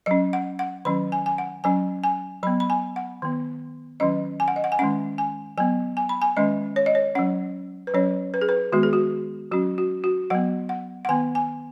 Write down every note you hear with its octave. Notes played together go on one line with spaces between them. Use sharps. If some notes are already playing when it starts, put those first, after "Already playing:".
F#3 C#4 D#5
F#5
F#5
D#3 F#3 C#4 B5
G#5
G#5
F#5
F#3 C#4 G#5
G#5
F#3 B3 B5
B5
G#5
F#5
D#3 B3
D#3 F#3 C#4 D#5
G#5
F#5
D#5
F#5
G#5
D#3 G#3 C#4 F#5
G#5
F#3 B3 G#5
G#5
B5
G#5
D#3 G#3 C#4 D#5
C#5
D#5
C#5
F#3 C#4 F#5
B4
F#3 C#4 C#5
B4
G#4
B4
D#3 G#3 B3 F#4
G#4
F#4
F#3 C#4 F#4
F#4
F#4
F#3 B3 F#5
F#5
F#5
D#3 B3 G#5
G#5